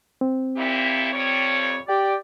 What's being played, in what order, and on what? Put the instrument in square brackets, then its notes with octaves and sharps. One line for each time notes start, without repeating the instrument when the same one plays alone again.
[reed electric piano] C4
[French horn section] A#2 E4 G4
F2 G3 C#5
[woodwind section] G4 D5